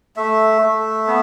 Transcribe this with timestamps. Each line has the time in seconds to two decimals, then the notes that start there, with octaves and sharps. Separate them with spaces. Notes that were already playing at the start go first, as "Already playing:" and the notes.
0.16 A3 E5
0.62 A3
1.07 B3